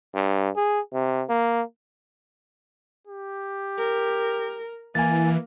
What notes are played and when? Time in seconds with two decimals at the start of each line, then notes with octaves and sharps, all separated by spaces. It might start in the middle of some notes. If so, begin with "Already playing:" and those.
0.14 G2
0.56 G#4
0.94 C3
1.29 A#3
3.08 G4
3.78 A#4
4.95 E3 A#3 G#5 A6